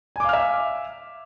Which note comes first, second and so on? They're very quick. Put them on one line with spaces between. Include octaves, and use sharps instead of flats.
G#5 D6 F5 F6 E5